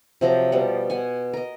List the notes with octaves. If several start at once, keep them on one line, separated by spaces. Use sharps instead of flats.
C3 F3 F#3 A#5
B2 F3 G3 F#5
B2 F#5 G#5
A#4 D#5